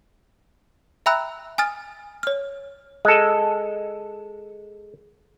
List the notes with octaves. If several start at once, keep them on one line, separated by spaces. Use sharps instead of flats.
E5 G5 A#5 B5 E6 F#6
G#5 D#6 F6 A6
C#5 F6
G#3 A4